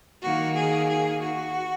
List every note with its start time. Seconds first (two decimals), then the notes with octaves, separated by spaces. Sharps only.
0.23 D#3 A#3 F#4
0.55 G#4
0.88 G#4
1.20 F#4